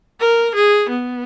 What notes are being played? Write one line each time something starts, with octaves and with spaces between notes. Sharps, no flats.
A#4
G#4
B3